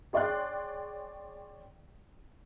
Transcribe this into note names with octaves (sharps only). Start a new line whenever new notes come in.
G#4 C#5 D5 G5 C6 F#6